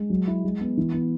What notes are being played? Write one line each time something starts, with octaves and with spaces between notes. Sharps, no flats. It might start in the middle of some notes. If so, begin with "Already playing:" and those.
Already playing: G#3
F#3
E4
G#3
B3
E3
B3